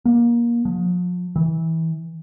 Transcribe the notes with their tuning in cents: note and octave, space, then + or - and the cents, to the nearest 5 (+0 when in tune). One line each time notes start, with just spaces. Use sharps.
A#3 +25
F3 +40
E3 -25